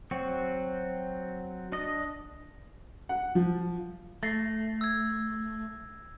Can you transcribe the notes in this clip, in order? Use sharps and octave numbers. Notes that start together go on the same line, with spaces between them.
F#3 C4 F#4
D4 D#5
F#5
F3
A3 A6 A#6 C7
E6 G#6